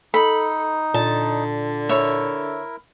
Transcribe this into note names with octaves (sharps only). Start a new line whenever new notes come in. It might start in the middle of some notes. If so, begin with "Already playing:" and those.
D#4 A4 B5
A#2 D3 A5
E4 A#4 C#5 E5